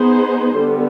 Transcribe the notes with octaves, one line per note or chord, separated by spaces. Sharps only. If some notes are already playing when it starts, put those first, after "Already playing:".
Already playing: B3 D#4 G#4 C5
D3 G3 B3